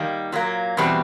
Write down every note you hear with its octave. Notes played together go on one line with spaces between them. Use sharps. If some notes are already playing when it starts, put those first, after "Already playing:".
Already playing: D#3 G3 A#3
A#2 F#3 A#3
E2 B2 G3 C4